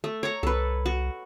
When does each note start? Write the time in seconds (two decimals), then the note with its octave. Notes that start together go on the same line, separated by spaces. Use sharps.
0.04 A3
0.23 C#5 A#5
0.43 C2 A4 B4
0.86 F#4